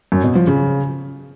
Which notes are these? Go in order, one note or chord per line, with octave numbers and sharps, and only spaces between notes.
F#2
B2
F3
C#3